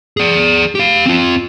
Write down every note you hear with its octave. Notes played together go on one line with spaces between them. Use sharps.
G#4 D5
G4 F5
C4 F4